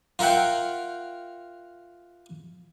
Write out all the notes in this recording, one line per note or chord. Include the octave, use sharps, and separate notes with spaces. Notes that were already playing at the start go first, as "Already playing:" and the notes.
F4 A#4 E5 F#5 G5